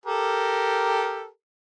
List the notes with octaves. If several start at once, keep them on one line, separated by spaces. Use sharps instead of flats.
G4 A4 A#4